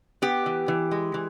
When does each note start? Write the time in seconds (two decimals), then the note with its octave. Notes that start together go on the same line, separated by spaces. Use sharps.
0.22 B3 G4
0.46 E3
0.68 E3
0.91 G#3
1.14 E3